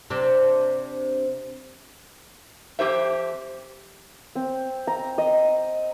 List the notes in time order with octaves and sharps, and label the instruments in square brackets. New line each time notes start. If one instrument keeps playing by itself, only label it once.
[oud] C3 C4 D4
[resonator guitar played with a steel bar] F2 G3 G4 C5 E5
[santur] C4
A#5
D#5